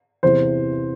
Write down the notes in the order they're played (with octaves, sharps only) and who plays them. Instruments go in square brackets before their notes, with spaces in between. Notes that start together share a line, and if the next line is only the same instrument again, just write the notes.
[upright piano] E2 C3 E3 C5